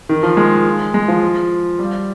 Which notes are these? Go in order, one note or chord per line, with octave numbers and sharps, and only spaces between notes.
D#3
F3
G#3
G#3
F3
G3